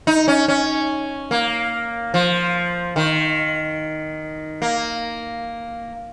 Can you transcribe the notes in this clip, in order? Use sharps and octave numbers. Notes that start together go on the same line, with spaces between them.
D#4
C#4
C#4
A#3
F3
D#3
A#3